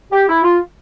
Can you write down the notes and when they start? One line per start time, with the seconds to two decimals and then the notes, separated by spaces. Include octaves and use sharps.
0.12 G4
0.28 E4
0.43 F4